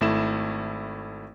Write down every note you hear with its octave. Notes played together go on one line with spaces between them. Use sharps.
G#1 A3 E4 E7